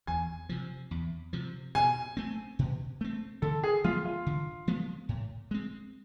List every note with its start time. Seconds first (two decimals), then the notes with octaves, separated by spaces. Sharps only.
0.07 E2 G#5
0.49 C3 F3
0.91 E2
1.33 C3 F3
1.75 B2 G#5
2.17 A3 C4
2.59 B2
3.01 A3 C4
3.42 D3 A4
3.64 G#4
3.84 F3 G#3 B3 F4
4.05 F4
4.26 D3
4.68 F3 G#3 B3
5.09 A2
5.51 G#3 C4